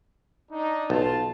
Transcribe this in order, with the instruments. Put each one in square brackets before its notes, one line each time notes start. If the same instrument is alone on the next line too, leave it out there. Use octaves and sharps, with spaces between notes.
[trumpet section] D4 D#4
[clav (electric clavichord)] B1 [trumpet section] F4 A5